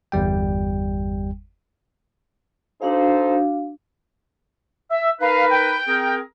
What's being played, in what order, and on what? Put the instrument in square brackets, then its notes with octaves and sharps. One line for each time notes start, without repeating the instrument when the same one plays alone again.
[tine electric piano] G1 E2 G3 G5
[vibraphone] D4 F#4 F5 [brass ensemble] D#4 A4 C5
[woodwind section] E5
[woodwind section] D#4 A#4 B4 [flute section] F5
[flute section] G5
[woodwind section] C4 G#4 A#4